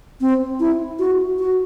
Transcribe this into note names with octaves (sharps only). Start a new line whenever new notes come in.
C4
E4
F#4
F#4